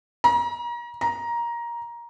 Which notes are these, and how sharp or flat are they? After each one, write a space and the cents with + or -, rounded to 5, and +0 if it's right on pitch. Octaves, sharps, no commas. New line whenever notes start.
A#5 +35
A#5 +15